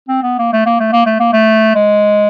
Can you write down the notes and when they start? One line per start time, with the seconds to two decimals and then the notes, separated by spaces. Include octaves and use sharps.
0.08 C4
0.23 B3
0.38 A#3
0.53 A3
0.66 A#3
0.80 A3
0.93 A#3
1.06 A3
1.20 A#3
1.33 A3
1.75 G#3